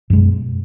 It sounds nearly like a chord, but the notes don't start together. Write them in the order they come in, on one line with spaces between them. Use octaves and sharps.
F#2 G#3 B2